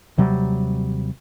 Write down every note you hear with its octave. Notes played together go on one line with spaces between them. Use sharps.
D#2 C3 F#3 G3